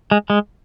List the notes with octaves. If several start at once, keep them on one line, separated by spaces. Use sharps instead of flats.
G#3
G#3